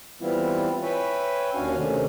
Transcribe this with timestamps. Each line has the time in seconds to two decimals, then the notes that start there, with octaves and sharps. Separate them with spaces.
0.21 E3 G3 B3 C4 E4 F4
0.83 B4 C#5 E5 G5 G#5
1.55 D#2 C#4 D4 F#4 F5 G#5
1.77 C3 D#3 A3 C#4 D4